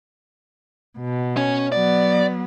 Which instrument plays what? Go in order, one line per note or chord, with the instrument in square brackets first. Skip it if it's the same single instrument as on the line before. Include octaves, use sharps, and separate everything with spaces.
[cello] B2
[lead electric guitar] C#4
[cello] F#3 B3 [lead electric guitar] D5